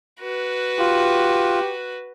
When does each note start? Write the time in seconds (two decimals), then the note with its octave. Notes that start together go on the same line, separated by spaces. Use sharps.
0.20 F#4 B4
0.79 F4 G4